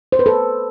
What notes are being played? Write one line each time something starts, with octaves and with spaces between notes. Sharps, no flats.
C5
B4
A4